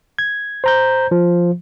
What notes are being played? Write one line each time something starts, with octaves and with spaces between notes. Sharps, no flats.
G#6
C5 A#5 G6
F3